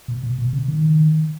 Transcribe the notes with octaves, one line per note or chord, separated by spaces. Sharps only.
B2
B2
B2
C#3
D#3